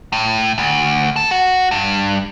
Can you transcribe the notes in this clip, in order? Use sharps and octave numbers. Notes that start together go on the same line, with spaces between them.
A2
D2
A4
F#4
G2